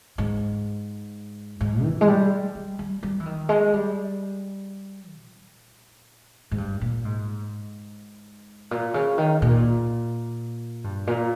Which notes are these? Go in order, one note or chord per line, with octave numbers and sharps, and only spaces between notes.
G#2
G#2
E3
G#3
G3
G3
G3
G3
E3
D#3
G#3
G3
A#2
G#2
G2
A#2
G#2
A#2
C#3
D#3
A#2
G2
A#2